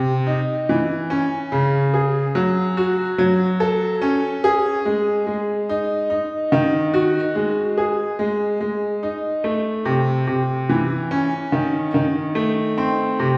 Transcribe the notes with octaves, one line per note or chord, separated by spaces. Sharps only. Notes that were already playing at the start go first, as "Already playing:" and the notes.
Already playing: C3
D#4
E3
C#4
C#3
G#4
F#3
F#4
F#3
A4
C#4
G#4
G#3
G#3
D#4
D#4
D#3
F#4
G#3
G#4
G#3
G#3
D#4
A3
C3
C3
E3
C#4
D#3
D#3
A3
C4
C3